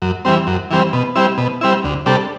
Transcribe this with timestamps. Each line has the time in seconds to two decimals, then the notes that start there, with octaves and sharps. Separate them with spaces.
0.02 F#2
0.25 E3 G3 C4
0.47 F#2
0.71 E3 G3 C4
0.93 B2
1.15 G3 C4 E4
1.38 B2
1.61 G3 C4 E4
1.84 D2
2.06 C3 G3 D4 A4